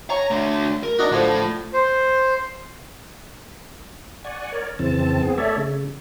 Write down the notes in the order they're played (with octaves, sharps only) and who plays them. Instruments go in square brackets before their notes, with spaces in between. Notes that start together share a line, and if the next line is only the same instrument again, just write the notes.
[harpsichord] C#5 G#5 C#6 [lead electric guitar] A#5
[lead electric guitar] D3 A3
A#4
[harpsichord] D4 D#4 F#4
[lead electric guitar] A2 [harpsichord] D3 F3
[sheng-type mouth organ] C5
[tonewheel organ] D5 F#5 G#5 C#6
A#4 C#5 D5
F2 C#3 E3 C4 A5
B3 C4 G#4
A3 A4 C#5 D5 E5
C#3